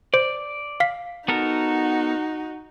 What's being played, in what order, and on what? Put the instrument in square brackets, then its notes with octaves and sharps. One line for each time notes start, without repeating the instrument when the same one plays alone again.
[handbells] C5 [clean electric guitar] D5
[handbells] F5 B6
[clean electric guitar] B3 A4 A#4 [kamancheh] D#4 F#4